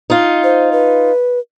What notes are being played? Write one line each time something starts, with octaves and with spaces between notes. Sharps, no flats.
D#4 F4
C5
B4